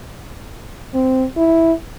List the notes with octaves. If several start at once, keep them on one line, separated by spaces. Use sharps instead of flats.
C4
E4